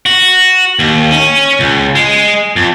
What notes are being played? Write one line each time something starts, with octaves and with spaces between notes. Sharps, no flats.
F#4
D#2
C#4
C#2
G#3
F2